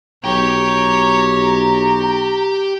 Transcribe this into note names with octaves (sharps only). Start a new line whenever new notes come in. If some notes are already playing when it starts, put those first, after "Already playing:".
B1 G4 C#5 G5 A#5